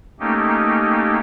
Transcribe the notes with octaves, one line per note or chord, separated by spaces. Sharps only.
A3 A#3 C#4 D#4 G4